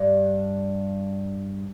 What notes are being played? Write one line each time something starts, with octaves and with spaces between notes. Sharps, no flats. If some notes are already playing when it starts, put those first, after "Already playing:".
Already playing: G2